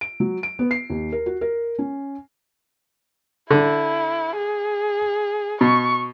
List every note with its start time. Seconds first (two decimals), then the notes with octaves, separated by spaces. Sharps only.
0.01 D7
0.20 F#3
0.43 D7
0.59 B3
0.71 C7
0.90 D#2
1.12 A#4
1.26 F#4
1.41 A#4
1.79 C#4
3.51 D3 E4
4.37 G#4
5.61 B2 C#6